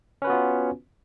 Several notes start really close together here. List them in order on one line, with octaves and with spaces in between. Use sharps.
C#4 B4 F#4 B3 F4